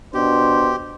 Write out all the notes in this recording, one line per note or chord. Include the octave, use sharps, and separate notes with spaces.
B2 D4 G4 C5